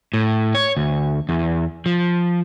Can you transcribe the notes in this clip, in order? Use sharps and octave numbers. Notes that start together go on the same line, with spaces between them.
A2
C#5
D2
E2
F3